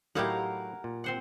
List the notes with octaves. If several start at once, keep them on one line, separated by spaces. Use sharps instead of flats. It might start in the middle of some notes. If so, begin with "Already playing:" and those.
A2 F#3 D#4 E4 G4 A#4 F5 F#5
A#2
C4 C5 F#5